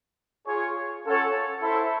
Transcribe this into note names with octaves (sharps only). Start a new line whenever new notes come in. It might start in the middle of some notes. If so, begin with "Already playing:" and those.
F4 G#4 C#5
C#4 F4 A4 C#5 F#5
E4 A4 C5 E5